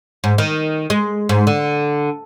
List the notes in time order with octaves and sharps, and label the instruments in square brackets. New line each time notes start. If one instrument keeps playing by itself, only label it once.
[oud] G#2
D#3
G#3
G#2
D3